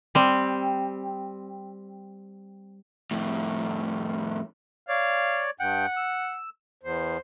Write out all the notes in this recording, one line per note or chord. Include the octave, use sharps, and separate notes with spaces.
G3 C4
F2 A2
C#5 D5 F5
G2 F#5 G5
E6
E2 C5